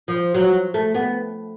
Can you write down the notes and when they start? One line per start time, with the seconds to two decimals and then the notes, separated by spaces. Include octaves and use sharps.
0.08 F3
0.34 F#3
0.74 A3
0.95 B3